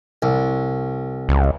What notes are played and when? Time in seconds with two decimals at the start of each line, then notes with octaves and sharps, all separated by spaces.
0.23 C2
1.29 C#2